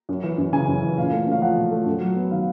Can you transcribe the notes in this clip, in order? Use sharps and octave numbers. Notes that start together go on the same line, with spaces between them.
F#2
E3
F#2
C#3 G#5
F#2
E3
A#2 F5
A3
C#4 F5
F3 F#5
A#2
A3
F#2
F#3
B3
D#3 F5